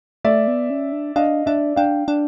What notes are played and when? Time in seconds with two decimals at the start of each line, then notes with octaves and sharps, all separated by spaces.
0.25 A3 D5 E5
0.48 B3
0.70 C#4
0.92 D4
1.16 D4 D#5 F5
1.46 D4 D5 E5
1.76 D4 F5 G5
2.08 D4